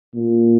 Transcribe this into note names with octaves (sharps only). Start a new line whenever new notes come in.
A#2